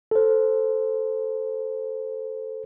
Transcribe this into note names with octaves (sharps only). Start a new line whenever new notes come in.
A4 C5